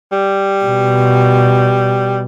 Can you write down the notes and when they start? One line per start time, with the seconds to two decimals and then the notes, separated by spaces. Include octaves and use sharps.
0.12 G3
0.65 B2